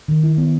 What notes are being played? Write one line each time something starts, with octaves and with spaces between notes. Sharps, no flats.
D#3
E4
B3